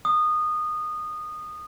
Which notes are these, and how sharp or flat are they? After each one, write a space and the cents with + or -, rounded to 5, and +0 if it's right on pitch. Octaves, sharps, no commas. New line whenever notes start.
D#6 -20